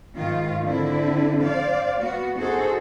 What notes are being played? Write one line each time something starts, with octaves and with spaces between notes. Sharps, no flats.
G#2 D#3 F4
D3 C4 E4
C5 D5 F5
B3 F#4
D#4 F#4 G#4 A4 C5